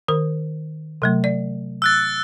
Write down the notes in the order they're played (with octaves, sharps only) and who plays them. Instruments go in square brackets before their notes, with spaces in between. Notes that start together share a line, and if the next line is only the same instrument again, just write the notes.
[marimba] D#3 A#4
C3 F#3 A3
D5
[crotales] E6 F#6 A6